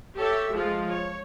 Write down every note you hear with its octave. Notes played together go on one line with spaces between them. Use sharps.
G4 A4 C#5 E5
F3 G#3 F4
C#5